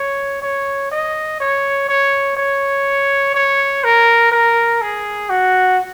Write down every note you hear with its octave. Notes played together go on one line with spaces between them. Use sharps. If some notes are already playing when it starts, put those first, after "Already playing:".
Already playing: C#5
C#5
D#5
C#5
C#5
C#5
C#5
A#4
A#4
G#4
F#4